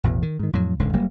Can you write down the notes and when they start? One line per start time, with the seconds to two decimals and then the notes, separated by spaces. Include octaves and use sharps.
0.04 A1 E2 B2 E3
0.22 D#3
0.39 G#2 D#3
0.53 F2 A2 F#3
0.79 D#1 C#2 G#2 D3
0.93 F1 F#3 G3 A#3